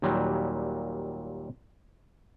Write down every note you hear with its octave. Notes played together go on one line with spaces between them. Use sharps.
D#2 A#2 F#3 G3